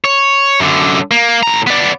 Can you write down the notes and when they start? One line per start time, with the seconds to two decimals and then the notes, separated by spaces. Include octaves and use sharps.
0.05 C#5
0.60 F#2 D3
1.11 A#3
1.43 A2 A#5
1.67 B3 D5